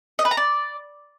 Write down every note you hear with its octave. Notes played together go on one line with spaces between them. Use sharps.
D#5
B4
A#5
D5